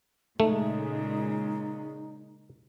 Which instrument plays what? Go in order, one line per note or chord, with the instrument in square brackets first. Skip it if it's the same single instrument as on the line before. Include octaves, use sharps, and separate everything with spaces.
[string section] A#2 C#3 G#3 [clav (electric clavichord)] A3 [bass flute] D#4